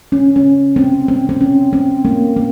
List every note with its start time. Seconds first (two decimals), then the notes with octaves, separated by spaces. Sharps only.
0.12 C#4
0.36 C#4
0.76 C4
1.08 C4
1.29 C4
1.41 C#4
1.73 C4
2.05 A#3
2.36 A#3